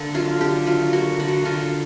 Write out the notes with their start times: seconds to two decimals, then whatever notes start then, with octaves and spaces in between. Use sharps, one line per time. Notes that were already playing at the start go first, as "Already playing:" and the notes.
Already playing: D3 A#3
0.14 F#3 F4
0.41 D3 G4
0.67 F#3 F4
0.93 A#3 F#4
1.19 D3 F#4
1.45 D3 F4